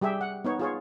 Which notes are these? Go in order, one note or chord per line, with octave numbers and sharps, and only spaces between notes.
G3 G4 G#4 E5 G5
F#5
B3 D#4 C#5
F4 G#4 C#5